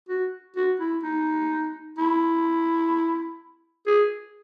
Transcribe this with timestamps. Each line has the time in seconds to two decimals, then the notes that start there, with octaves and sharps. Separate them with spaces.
0.09 F#4
0.56 F#4
0.80 E4
1.03 D#4
1.98 E4
3.87 G#4